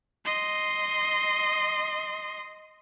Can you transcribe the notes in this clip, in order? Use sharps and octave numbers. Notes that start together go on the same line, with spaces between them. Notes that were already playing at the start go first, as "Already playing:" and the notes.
D#5 C6